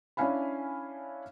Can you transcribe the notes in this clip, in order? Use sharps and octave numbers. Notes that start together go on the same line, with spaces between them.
C#4 D4 E4 F5 G#5 B5